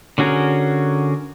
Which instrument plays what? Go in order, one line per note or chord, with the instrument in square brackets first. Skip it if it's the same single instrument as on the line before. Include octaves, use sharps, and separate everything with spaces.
[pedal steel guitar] D3 C#4 F#4 G#4 A#4